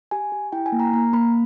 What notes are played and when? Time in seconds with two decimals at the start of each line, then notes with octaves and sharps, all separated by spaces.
0.11 G4 G#5
0.32 G4
0.52 E4 G5
0.66 G#5
0.72 A#3
0.80 A#5
0.93 A#3 A#5
1.13 A#3 B5